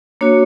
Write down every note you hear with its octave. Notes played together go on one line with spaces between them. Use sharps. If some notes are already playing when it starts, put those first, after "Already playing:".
A#3 D4 F#4 C#5